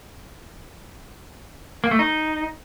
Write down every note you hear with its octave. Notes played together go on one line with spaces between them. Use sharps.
A#3
A3
D#4